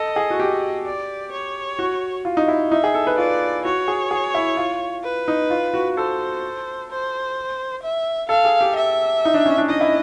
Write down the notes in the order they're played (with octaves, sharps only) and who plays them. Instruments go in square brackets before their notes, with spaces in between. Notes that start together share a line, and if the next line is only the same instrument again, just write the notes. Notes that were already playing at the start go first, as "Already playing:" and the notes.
Already playing: [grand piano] A4 [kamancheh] D#5
[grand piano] G#4
F#4
G4
[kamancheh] D5
C#5
[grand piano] F#4
F4
D#4
E4
[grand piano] D#4 [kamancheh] E5
[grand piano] G#4
A4
B4
[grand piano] F4 [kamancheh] D5
[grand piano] F#4 [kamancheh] C#5
[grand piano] G#4
G#4
E4
F4
[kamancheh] B4
[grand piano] D#4
F4
F#4
[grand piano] A4 [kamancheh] C5
[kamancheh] C5
E5
[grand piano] A4 [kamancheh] F5
[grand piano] G#4
G4
[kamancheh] E5
[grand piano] D#4
D4
C#4
D4
[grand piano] D#4 [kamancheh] D#5
[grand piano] E4